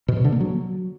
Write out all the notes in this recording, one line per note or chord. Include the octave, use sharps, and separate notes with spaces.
B2
C3
D3
A#3
F#3